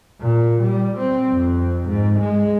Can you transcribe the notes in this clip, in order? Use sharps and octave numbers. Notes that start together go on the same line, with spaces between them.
A#2
G3
C4
F2
G#2
G#3